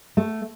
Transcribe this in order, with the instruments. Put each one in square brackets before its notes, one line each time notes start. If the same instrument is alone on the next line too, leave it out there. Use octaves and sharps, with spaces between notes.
[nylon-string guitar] A3